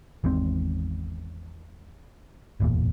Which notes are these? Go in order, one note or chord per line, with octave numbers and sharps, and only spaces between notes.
G#1 E2 G#2 C4
D1 G1 E2 A#2